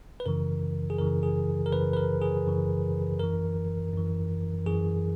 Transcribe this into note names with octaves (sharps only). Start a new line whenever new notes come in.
B4
F#2 C#3 E3 A#4
G#4
F#2 C#3 E3 A#4
G#4
A#4
F#2 C#3 E3 B4
B4
A#4
G#4
F#2 C#3 E3
F#2 E3 A#4
F#2 E3
F#2 E3 G#4